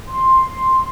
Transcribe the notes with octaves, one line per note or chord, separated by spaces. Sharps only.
C6